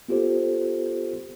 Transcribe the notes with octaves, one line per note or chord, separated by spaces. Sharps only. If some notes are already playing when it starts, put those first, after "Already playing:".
B3 F4 G4 A4 C5